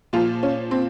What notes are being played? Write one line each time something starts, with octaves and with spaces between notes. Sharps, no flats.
A#2 F3 F4
C#4
C4